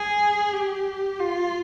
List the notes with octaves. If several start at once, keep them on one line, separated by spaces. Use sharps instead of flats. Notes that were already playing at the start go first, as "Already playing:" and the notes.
Already playing: G#4
G4
F4